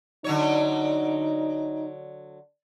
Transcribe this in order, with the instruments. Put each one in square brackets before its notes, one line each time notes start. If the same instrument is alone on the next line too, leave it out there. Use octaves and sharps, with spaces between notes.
[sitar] D3 F#3 C#5 [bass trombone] D#4